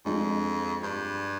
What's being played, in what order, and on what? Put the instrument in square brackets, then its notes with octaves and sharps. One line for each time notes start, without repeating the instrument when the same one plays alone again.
[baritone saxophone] F2 [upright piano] F3 G#3 D4
[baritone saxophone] G2